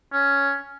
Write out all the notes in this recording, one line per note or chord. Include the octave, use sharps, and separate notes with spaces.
C#4